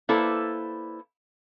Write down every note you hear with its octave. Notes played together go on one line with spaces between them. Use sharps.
A#3 E4 A4 B4 C5 D5